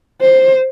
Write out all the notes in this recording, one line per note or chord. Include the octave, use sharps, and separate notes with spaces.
C5